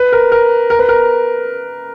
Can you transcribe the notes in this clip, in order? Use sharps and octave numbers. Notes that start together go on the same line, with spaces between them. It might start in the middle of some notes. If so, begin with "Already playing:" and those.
Already playing: B4
A#4
A#4
A#4
B4
A#4